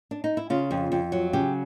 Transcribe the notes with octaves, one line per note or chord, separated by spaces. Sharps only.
D4
D#4
E4
C#3 F4
F2
F2
F#3
C#3 G4